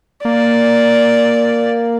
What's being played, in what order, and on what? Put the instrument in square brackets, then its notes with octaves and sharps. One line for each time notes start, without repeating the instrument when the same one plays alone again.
[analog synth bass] A#3 [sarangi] D5